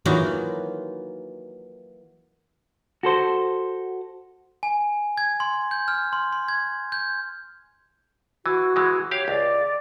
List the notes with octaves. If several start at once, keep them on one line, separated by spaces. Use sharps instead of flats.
E3 F#3 A#3 D#4 F4 F#4
F#4 A4 C5
G#5
G#6
C6
G6
F6
C6
C6
G#6
G6
E3 F#4
E3 G#3
G4 C#5 F5
C#2 D5